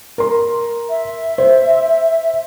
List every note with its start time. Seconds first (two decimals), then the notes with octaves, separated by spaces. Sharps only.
0.18 A#4 C6
0.89 E5
1.38 C5